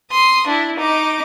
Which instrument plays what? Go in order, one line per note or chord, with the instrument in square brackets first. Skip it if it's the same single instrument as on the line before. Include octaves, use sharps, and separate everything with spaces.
[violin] C6 D#6
D4 E4
D#4 D6